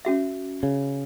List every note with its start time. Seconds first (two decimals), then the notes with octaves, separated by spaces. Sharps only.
0.05 C#4 F#4 E5
0.63 C#3